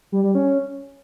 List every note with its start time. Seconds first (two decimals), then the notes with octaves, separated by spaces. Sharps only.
0.12 G3
0.24 G3
0.35 C#4